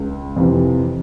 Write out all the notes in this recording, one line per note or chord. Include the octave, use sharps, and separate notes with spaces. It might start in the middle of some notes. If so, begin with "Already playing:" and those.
Already playing: C#2
F2 C3 E3